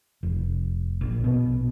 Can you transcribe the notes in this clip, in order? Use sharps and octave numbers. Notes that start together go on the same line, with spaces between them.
F1
A#1
B2